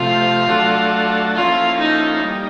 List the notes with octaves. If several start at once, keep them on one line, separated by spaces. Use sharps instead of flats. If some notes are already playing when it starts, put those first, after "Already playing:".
Already playing: C3 F3 A3 F4
F#3 A3 D4 F#4 A4
F3 A#3 C#4 E4 F4 A4
D#4
G3 A#3 D#4